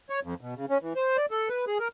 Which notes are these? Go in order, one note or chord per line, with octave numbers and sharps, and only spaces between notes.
C#5
F2
B2
C#3
C#4
E3
C5
D5
A4
B4
G#4
A#4